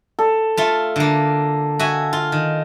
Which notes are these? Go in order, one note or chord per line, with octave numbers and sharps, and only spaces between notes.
A4
A3 F4
D3 A#3
F#4 E5 G#5
F4
D#3